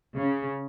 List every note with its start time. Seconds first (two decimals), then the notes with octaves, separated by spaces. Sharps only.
0.16 C#3